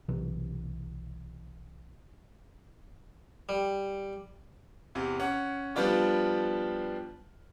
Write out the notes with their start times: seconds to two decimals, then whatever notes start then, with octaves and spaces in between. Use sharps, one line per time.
0.09 B1 C3 E3
3.49 G3
4.95 E2 C3
5.20 C#4 F#5
5.75 F3 G3 B3 D4 F4 G4